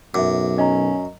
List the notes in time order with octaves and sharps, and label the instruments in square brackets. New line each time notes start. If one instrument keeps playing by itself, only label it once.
[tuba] B1 [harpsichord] F#2 [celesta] E5 D6
[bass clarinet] C#4 [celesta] D#5 A#5